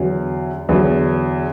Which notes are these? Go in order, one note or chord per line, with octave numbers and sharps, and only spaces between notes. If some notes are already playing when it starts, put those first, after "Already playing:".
Already playing: E2 D3 F#3
E2 D3 F#3